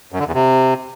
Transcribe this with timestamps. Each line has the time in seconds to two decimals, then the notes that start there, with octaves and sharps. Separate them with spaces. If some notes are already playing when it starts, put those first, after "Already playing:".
0.12 F#2
0.20 D3
0.27 E2
0.34 C3